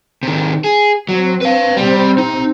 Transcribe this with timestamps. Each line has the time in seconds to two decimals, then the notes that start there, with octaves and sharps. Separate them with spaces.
0.23 C3 D#3
0.64 G#4
1.09 F#3 C4
1.41 B4 F5
1.77 C3 G3 C4
2.18 D#4